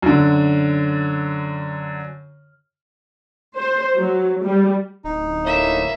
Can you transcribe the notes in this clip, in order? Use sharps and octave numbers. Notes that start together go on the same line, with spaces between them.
F#2 D3
C5
F#3
G3
D1 D#4
A2 A#3 E5